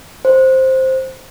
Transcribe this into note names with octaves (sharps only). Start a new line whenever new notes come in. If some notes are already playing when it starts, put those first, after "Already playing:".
C5